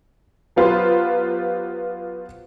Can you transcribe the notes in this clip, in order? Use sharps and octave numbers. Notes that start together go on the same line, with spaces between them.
F#3 B3 F4 G4 B4 C5